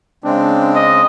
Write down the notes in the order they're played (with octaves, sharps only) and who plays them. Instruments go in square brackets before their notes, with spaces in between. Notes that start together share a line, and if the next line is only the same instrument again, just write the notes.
[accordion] C#3 G#3 C4 [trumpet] D4
[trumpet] D#5